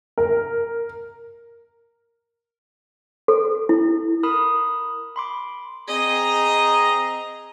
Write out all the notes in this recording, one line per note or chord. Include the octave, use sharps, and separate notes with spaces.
A#4
A4
E4
A#4 B5 D#6
B5 C6 D6
C4 G#4 D#5 A#5